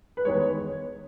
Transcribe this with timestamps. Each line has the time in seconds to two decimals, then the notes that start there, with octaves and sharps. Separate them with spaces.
0.17 B4
0.25 E2 D#3 G#3 C#5